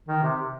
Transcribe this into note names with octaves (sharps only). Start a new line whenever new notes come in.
D#3
C3